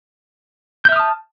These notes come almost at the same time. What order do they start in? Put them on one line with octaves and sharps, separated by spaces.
G6 E5 F6 D#6 A5